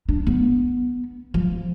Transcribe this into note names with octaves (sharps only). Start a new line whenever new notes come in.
D4
B3
F3